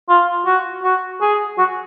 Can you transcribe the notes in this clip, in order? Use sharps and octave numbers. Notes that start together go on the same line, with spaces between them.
F4
F#4
F#4
G#4
F#4